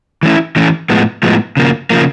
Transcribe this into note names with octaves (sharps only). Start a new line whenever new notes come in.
E3 A3 C#4 E4
E3 A3 C#4 E4
A2 F3 G#3 B3
A2 F3 G#3 B3
C#3 F3 A#3
C#3 F3 A#3